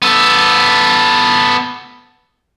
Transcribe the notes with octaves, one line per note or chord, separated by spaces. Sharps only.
B3 A4